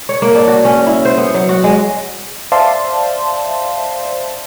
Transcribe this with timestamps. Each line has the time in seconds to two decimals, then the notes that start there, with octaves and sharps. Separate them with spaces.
0.09 C#5
0.22 A#3
0.35 D4
0.48 F#4
0.65 C#4
0.86 E4
1.05 C5
1.17 B3
1.34 F#3
1.49 F#4
1.64 G#3
2.52 C5 D5 E5 F5 A5 C6